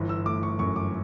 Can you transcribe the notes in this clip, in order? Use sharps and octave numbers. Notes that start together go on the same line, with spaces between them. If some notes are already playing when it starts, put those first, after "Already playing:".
Already playing: G1 E3
E6
A3 D6
C#6
F#2 C#6
D6